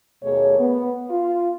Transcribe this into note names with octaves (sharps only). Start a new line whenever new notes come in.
D#2 B2 A3 A#3 G#4 C#5
B3
F4